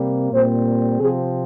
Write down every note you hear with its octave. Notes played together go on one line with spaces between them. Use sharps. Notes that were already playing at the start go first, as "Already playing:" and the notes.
Already playing: C3 G3 A#3
A#2 G3 C4 C5
C3 F3 C4 G#4